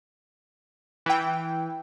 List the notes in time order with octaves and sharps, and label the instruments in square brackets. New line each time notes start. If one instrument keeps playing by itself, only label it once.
[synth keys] E3 G5